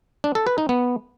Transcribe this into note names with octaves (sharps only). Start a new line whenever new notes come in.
D4
A4
B4
D#4
B3